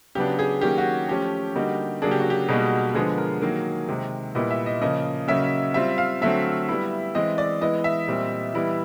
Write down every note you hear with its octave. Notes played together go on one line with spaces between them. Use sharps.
C#3 F#3 B3 D4 G4
G#4
D#3 F#3 A#3 C#4 G4
F#4
F3 A3 C#4 G4
D3 G3 A#3 D#4 F#4
C#3 F#3 A#3 D4 G#4
G4
F#4
G4
B2 G3 A#3 D#4 F#4 G#4
D3 F3 G#3 B3 G#4
A#4
D#3 F#3 A#3
C3 D#3 G#3
A#2 G3 B3 E4 D#5
E5
D#5
C#3 F3 A#3 D#5
C#3 F#3 A#3 C#4 E5
G3 C4 F4 E5
F5
D3 F#3 A3 C4 E5
G3 B3 E4
E3 G#3 C4 D#5
D5
E3 G#3 B3 E4 D#5
E5
A#2 G3 C4
E3 G3 B3 E4